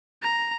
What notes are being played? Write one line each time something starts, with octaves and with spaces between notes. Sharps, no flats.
A#5